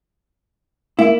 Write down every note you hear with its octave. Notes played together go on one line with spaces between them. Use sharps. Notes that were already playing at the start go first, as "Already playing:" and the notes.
A#3 E4